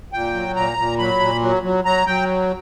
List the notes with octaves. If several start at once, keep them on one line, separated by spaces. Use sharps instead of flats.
A#2 G5
F#3
A#2 A#5
A#2
F#3 B5
A#2
F#3
F#3
F#3 A#5
F#3 G5